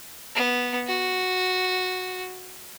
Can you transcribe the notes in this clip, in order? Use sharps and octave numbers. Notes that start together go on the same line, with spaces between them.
B3
F#4